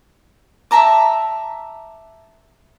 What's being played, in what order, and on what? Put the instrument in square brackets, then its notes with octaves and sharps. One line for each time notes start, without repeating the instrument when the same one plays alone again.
[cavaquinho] E5 A5 A#5 D6